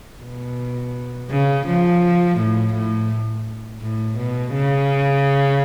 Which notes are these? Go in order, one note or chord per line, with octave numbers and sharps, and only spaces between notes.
B2
C#3
F3
A2
A2
A2
B2
C#3